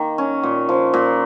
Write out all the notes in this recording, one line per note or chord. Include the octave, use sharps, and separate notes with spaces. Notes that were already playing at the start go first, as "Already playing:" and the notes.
Already playing: D#3 A#3
C#4
A#2
F3
A#2